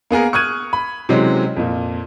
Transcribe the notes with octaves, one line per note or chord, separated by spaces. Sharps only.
A#3 B3 G#4 A#4
C#6 D#6 F6 F#6 G#6 D#7
B5
C3 E3 F#3 G#3 C4 C#4
F2 A#2